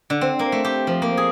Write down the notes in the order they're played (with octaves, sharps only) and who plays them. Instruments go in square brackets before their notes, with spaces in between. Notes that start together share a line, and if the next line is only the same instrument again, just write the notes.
[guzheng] D3
C4
A#3
A3
G4
F3
A#3
G#4